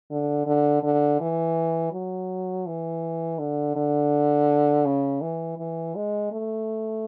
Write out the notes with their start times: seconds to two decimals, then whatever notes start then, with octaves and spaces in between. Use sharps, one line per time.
0.11 D3
0.46 D3
0.83 D3
1.21 E3
1.92 F#3
2.66 E3
3.39 D3
3.76 D3
4.85 C#3
5.21 E3
5.58 E3
5.95 G#3
6.32 A3